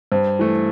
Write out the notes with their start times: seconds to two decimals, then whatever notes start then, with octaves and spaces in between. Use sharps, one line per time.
0.12 G2 C5
0.39 E3 A3